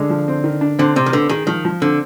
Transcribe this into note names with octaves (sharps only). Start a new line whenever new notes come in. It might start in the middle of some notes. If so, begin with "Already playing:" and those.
Already playing: D3 G#3
F3
C4
D#3
D4
D3 C4
C3 C4
D#3
D3 B3
D#3 G#4
D#3 F3
F3
D3 C4